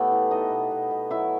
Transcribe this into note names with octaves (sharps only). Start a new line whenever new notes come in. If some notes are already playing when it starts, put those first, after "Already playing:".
Already playing: A2 A3 B3 G4 A4 B4
E3
B3 D#4 D#5
B2
B2
B2
F#3 E4 E5